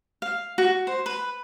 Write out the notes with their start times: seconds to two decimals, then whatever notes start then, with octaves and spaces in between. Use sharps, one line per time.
0.22 F5
0.58 F#4
0.87 C5
1.06 B4